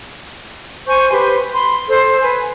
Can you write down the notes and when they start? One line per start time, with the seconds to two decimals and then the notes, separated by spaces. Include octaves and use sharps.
0.87 C5 G#5 C#6 G6
1.11 G4 B4 C5 C6
1.53 B5 C6
1.88 A4 C5
2.20 B4 G#5